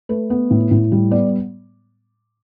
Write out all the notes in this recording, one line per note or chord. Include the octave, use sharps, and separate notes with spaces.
A3 B4
B3
A2
A2
G3
B3 D5